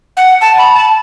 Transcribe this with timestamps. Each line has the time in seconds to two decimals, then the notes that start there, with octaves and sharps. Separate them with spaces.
0.17 F#5
0.41 A5
0.58 B5
0.74 A5